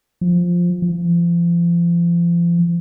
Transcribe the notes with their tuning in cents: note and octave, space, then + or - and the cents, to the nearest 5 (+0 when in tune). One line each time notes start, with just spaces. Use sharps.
F3 +5
F3 -35